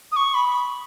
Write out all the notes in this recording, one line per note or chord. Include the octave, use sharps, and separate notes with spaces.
D#6
C#6
B5